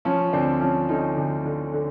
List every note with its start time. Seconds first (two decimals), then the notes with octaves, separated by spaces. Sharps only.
0.05 F3 C#4
0.33 D2 C4 D4
0.60 F3 C#4
0.89 D3 C#4 D#4
1.17 D2
1.46 D3
1.73 D3